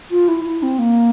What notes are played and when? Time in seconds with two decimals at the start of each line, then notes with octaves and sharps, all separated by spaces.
0.11 F4
0.28 E4
0.45 E4
0.63 C4
0.79 A#3